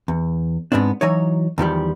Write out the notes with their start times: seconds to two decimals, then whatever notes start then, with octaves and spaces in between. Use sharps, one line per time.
0.08 E2
0.72 G#2 C3 B3 C4 D4
1.01 E3 F#3 D#4 C#5
1.58 E2 D#3 F3 G3